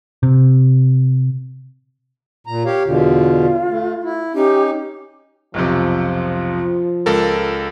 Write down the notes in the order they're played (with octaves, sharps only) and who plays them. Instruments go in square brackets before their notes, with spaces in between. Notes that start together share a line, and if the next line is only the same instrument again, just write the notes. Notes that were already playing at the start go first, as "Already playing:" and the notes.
[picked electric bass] C3
[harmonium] A#2 A#5
G4 C#5 F5
[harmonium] E2 B2 D3 [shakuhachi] F4
[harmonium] A3
E4
[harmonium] C#4 D#4 [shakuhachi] G4
[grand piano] B1 F2 C3 [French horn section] F3
[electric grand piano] C#2 A4 A#4 [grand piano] A6